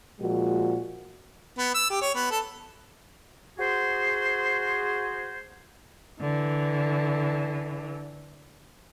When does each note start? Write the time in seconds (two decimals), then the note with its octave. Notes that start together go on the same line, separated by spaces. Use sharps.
0.20 A#2 F3 G#3 F#4
1.58 B3
1.74 E6
1.90 G4
2.02 C#5
2.15 B3
2.31 A4
3.58 F#4 G#4 C5
6.20 D3 E3